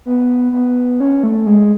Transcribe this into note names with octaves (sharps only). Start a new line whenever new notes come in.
B3
B3
C#4
A3
G#3